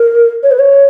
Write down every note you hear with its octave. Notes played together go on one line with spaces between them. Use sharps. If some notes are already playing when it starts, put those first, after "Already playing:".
Already playing: A#4
C#5
B4
C#5